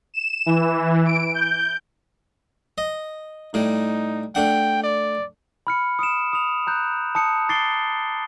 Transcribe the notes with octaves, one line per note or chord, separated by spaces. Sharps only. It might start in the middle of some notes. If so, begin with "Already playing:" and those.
E7
E3
D7
G6
D#5
A2 G3 D#4
A3 D4 F#5 G5
D5
B5 F6 C#7
D#6 C#7 D7 E7
D#6 F7
A#5 F#6 G6
A5 D#6 C#7
D6 A6 C7 D7 G7